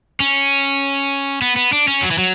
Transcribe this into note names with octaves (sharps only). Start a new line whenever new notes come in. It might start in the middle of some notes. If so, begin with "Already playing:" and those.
C#4
B3
B3
D4
C#4
F#3
E3
F#3